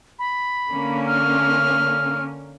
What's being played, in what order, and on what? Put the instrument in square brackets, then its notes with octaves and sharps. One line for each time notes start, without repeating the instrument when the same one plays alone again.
[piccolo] B5
[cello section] D3 A#3 C#4
[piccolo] F6